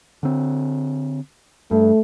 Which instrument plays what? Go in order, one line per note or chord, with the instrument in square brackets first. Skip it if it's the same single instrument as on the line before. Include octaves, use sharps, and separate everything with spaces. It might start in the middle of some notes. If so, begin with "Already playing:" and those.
[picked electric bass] D3 C4
[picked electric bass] G2 [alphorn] A3